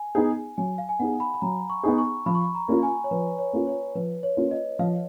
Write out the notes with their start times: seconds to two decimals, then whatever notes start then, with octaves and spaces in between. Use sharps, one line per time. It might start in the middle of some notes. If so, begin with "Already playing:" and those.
Already playing: G#5
0.15 B3 D#4 G#4
0.58 F#3 G#5
0.78 F5
0.89 G#5
0.99 B3 D#4 G#4 F#5
1.20 B5
1.34 B5
1.42 F#3 A#5
1.70 C#6
1.83 B3 D#4 G#4
1.98 C#6
2.26 F3 B5
2.35 C#6
2.43 B5
2.55 A#5
2.68 A#3 C#4 F4
2.83 G#5
3.04 C#5
3.11 F3 B4
3.39 C#5
3.53 A#3 C#4 F4
3.67 C#5
3.95 F3 B4
4.23 C#5
4.37 A#3 C#4 F4
4.51 D#5
4.79 F3 F5